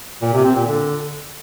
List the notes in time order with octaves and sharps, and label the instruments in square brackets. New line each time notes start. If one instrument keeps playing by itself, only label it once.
[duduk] A#2
C3
C4
A#2
D3